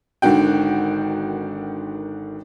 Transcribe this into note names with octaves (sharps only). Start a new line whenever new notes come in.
G#1 D3 D#3 F#4 G5